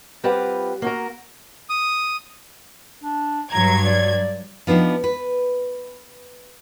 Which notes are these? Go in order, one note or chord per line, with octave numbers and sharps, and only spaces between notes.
G3 C4 F4 G4 B4 F#5
A#3 F#4 A#4
D#6
D4
G2 F#3 A#5 G#6
D5
F3 B3 D4 D#4 G4
B4